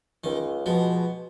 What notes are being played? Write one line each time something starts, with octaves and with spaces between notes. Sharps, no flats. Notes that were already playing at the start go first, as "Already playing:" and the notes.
C#2 D#3
B2 F3 G#3 B3 F#4